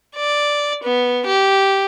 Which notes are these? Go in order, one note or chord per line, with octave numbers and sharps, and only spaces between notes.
D5
B3
G4